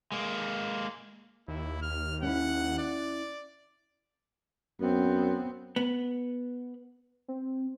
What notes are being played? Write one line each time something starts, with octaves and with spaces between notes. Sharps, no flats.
G#3 A#3
D#2 E4
F6
C#4 E4 F#5
D5
F#2 B3 C4
B3
C4